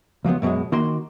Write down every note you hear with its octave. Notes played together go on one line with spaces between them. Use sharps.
C#2 F3 F#3 B3
F#2 B2 F3 F#3 G#3
D#3 A#3 F#4 C6